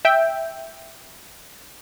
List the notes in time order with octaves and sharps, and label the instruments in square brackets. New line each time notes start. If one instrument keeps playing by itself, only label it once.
[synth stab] E5 G5